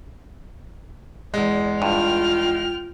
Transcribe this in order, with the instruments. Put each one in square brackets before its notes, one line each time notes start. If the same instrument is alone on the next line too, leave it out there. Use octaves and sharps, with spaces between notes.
[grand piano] E2 G#3 [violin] D5
[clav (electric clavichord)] G2 [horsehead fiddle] F4 G5 [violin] F6